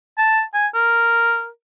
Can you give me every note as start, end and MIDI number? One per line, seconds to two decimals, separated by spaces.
0.18 0.42 81
0.54 0.67 80
0.75 1.48 70